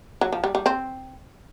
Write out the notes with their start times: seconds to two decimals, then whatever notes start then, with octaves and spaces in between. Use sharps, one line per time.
0.21 F#3
0.32 F3
0.44 G3
0.55 G3
0.66 C4